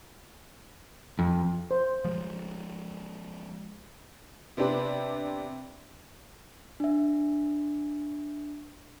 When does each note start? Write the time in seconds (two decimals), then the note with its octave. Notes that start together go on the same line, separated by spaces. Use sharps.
1.19 F2
1.71 C5
2.05 F3 G#3
4.57 C3 B3 C4 D4 G4 B4
6.80 D4 E5